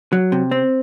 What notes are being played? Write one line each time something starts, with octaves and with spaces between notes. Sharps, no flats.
F#3
C3
C4